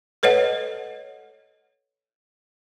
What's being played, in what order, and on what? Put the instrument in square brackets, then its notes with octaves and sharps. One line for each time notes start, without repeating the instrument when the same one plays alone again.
[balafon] A4 B4 C#5 D#5 F#5